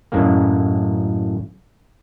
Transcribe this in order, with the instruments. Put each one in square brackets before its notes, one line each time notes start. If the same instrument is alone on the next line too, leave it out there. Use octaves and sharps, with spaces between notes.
[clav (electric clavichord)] F#2 A2 G#3 A#3